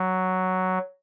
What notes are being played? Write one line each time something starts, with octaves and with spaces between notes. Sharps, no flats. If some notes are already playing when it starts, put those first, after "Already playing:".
Already playing: F#3